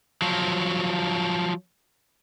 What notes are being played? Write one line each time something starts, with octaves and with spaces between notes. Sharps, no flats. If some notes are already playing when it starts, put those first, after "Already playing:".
F3 F#3